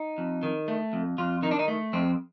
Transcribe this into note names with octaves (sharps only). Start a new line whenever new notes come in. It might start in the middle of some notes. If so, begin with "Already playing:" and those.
Already playing: D#4
F2
D#3
A3
F2
F2 F4
D#3 D#4
D4
D#4
A3
F2 C4